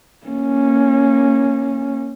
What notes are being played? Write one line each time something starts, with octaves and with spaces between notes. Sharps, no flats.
A#3 C#4